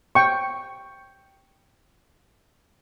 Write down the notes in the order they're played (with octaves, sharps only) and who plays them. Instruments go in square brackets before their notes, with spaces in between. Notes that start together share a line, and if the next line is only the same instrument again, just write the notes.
[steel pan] G5 C#6